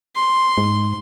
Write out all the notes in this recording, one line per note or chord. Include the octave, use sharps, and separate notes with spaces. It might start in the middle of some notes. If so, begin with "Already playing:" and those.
C6
G#2